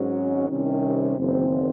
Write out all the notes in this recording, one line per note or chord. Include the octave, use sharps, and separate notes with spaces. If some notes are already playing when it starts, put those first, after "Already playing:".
Already playing: G#1 G#2 F#3 C#4
C2 C3 D#3 C#4
F#1 E2 D#3 C4